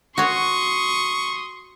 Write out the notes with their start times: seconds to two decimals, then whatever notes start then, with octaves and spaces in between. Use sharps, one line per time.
0.18 F#4 C#5 C6 C#6 D#6